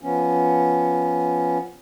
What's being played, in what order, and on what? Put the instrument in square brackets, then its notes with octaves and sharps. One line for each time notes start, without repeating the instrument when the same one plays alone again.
[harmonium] F3 B3 C#4